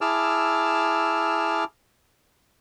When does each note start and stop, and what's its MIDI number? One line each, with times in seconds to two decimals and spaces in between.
0.01 1.64 64
0.01 1.64 68
0.01 1.64 81
0.01 1.64 86
0.01 1.64 88
0.01 1.64 89